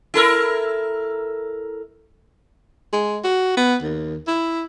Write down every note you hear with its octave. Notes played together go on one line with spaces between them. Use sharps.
E4 A4 A#4
G#3
F#4
B3
D#2
E4